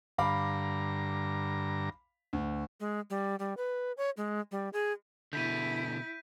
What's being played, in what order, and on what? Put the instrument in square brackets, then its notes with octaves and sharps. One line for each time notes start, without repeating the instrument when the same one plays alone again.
[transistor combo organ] G2 D3 A#5 [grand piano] F5 B5 D6
[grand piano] D2
[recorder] G#3
G3
G3
B4
C#5
G#3
G3
G#4
[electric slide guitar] B2 D3 [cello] E4 [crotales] G6 B6 D#7